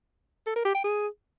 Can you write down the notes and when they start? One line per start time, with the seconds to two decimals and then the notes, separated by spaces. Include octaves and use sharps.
0.46 A4
0.56 A#4
0.65 G4
0.75 G5
0.84 G#4